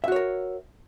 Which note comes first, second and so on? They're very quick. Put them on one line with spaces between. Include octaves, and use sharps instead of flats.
E5 F#4 C#5 A#4